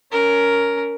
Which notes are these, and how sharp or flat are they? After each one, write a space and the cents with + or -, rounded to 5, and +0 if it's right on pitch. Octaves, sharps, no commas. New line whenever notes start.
C#4 +20 A#4 +0